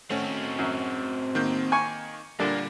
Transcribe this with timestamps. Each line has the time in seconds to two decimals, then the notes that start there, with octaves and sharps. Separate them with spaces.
0.10 A3 C4 C#4 F#4
0.59 F#2
1.35 D#3 A#3 G6
1.72 G#5 C#6
2.40 A#2 D3 G3 A#3 D4